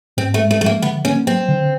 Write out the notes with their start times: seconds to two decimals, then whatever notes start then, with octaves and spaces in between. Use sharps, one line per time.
0.17 G#2 C4
0.34 A3
0.38 G#3
0.51 A3
0.61 F3 A3
0.66 A#3
0.82 D3 B3
1.05 A#3 C#4
1.27 F#3 C4
1.49 D3